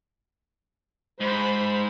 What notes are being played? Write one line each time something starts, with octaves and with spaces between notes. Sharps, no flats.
G#2 C5 B5